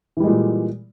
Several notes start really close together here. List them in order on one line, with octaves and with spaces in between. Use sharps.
E3 G3 G#3 A#2